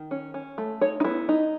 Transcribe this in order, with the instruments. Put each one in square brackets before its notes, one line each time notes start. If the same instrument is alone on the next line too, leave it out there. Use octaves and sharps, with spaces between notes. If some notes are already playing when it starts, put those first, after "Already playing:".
Already playing: [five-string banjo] D#3
C#4
C#4
A3
D#4 C#5
D#4
B3 E4
D#4